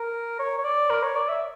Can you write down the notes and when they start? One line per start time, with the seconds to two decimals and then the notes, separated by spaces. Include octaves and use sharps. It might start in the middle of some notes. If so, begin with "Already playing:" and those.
Already playing: A#4
0.39 C#5
0.58 C#5
0.64 D5
0.90 A#4
1.03 C#5
1.16 D5
1.29 E5